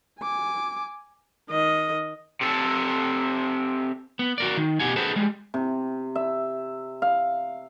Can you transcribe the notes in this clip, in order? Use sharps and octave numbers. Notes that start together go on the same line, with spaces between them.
G#5 D6
D#3 D#5
C3 A4
B3
F#4 A#4 D5
D#3
B2 G4 F#5 G#5
G#4 A4 B4 C5 F#5 A5
G3 G#3
C3
E5
F5